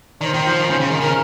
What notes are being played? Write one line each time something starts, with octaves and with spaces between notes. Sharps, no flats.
D#3 C5 D5
D#3
F3
D#3
C#3
C#3
D#3
C#3 A#4